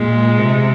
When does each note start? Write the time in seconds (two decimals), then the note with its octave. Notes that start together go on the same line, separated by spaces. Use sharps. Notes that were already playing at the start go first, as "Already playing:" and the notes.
Already playing: A#2 G#3
0.38 C3